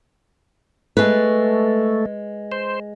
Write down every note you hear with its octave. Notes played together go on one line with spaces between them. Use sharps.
G#3 A3 B4
C5